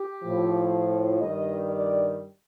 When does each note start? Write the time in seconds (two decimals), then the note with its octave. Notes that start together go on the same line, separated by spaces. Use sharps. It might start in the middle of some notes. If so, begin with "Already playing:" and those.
Already playing: G4
0.22 A2 F3
1.20 G2 D#3 G3 D#5
1.70 D5